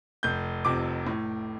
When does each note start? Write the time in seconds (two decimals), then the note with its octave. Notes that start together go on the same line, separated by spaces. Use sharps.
0.23 F1 G6
0.65 F2 C3 D6
1.07 A2